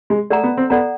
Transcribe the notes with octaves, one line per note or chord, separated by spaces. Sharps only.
G#3
A3 A4 D5 F#5 A#5
B3
C4
B3 A4 D5 F#5 A#5